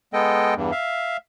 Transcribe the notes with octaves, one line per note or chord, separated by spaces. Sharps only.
G#3 B3 A4 D#5 G5
E2 G2
E5 F5